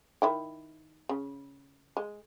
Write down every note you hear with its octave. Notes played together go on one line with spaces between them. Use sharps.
D#3 E4 G5
C#3
G#3